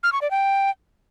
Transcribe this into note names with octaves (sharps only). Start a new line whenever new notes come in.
F6
C#6
D5
G5